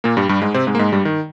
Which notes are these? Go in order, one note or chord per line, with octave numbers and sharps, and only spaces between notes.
A#2 A#3
G2 G3
G2 G3
G#2 G#3
C3 C4
G#2 G#3
A#3
G#2 G#3
G2 G3
D#3